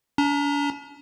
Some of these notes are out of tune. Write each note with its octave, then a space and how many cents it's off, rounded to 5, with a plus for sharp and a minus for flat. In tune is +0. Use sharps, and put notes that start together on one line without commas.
D4 -45 A#5 +0